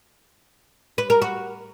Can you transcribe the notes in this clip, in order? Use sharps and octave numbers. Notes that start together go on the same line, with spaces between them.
B4
A#4
F#4